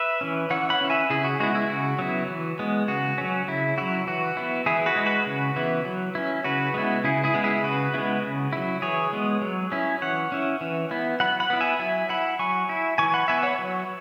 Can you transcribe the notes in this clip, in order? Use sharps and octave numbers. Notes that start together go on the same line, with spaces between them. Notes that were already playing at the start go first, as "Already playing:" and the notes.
Already playing: B4 E5
E3 C#4
E3 C#5 F#5
F#5 B5
C#4 E4
E5 G#5
C#3 E4 G#4
F#4
G#3 B3 E4 F#4
E4
C#3 F#4
F#3 B3 E4
E3
G#3 B3
C#3 F#4
F#3 C#4
C#3 E4
F#3 E4 F#4
E3 F#4
B3 E4
E3 E4 G#4
F#4 B4
G#3 E4
F#4 B4
C#3
E3 B3 E4
F#3
C#4 E4
C#3 F#4 B4
G#3 B3 E4
C#3 E4 G#4
E4 G#4
G#3 B3
E4 G#4
C#3 F#4 B4
G#3 B3 E4
C#3
F#3 E4
E3 G#4 C#5
G#3 B3
F#3
C#4 E4
E3 C#5 F#5
C#4 E4
E3
B3 E4
F#3 F#5 B5
F#5 B5
B3 E4
E5 G#5
F#3 E5 G#5
E4 F#5 B5
F#3 G#5 C#6
E4
E3 G#5 C#6
F#5 B5
B3 E4 E5 G#5
C#5 F#5
F#3